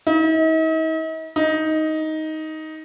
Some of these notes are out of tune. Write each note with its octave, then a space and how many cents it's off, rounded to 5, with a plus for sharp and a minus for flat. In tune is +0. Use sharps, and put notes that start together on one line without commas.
D#4 +45
D#4 +10